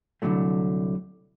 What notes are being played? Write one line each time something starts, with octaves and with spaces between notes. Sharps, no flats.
C2 F2 D3 F#3 A3